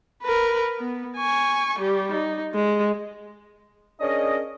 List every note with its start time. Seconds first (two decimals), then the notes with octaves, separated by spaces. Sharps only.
0.23 A#4 B4
0.79 B3
1.17 G#5 C#6
1.79 G3 G4
2.12 D#4
2.54 G#3
4.00 C#4 D4 G#4 A#4 D#5